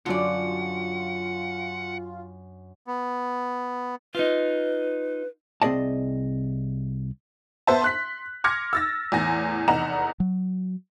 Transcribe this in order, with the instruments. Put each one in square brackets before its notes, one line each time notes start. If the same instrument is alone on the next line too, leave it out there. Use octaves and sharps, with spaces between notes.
[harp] F#2 D4 [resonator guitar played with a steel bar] D3 D5 [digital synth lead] F4 [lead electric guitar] F#5
[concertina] B3
[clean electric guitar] D#4 F4 [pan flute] B4
[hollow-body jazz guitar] C2 C4 G#4 D5 D#5 A5
[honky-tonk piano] B3 C5 E5 A5
C6 F#6 B6
C6 D6 F6 G#6 A#6 C#7
E6 A6 A#6
E2 A2 G#5 A#6
F1 E2 D#4 F#5 A#5 E7
[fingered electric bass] F#3